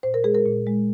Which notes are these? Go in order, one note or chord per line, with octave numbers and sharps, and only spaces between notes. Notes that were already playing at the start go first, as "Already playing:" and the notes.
A#2 C5
A#4
G#3 G#4
A#4
A#2
G#3